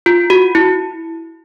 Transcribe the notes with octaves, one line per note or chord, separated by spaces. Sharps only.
F4
F#4
E4